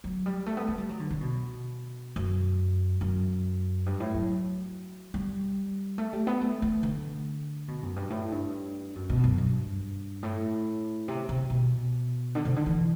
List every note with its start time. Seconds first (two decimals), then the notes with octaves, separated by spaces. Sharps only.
0.04 F#3
0.26 G3
0.46 A3
0.57 B3
0.68 A3
0.78 G3
0.89 F#3
1.00 D3
1.10 D3
1.21 B2
2.16 F#2
3.01 F#2
3.86 G2
4.00 A2
4.14 F#3
5.14 G3
5.98 A3
6.13 G3
6.27 B3
6.41 A3
6.62 A3
6.83 D3
7.68 B2
7.83 F#2
7.96 G2
8.10 A2
8.32 G2
8.95 F#2
9.09 B2
9.24 F#2
9.38 G2
10.23 A2
11.08 C3
11.29 C3
11.50 B2
12.35 D3
12.45 C3
12.56 D3
12.66 E3